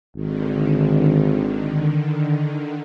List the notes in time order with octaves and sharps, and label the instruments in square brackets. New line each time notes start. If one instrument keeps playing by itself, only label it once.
[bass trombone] G#1 [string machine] D3 D#3